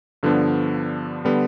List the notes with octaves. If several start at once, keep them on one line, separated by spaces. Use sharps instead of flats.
G2 D3 F3 B3 D4
D3 G3 B3